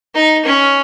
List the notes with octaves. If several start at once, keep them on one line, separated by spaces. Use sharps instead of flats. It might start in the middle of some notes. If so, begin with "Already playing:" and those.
D#4
C#4